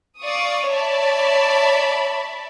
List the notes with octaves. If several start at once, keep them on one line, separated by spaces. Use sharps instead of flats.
D5 F5 C#6 D#6
C#5 D5 E5 A5 B5